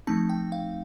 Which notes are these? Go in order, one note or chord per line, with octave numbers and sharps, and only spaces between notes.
F3 A3 C4 D#4 A5
G5
F5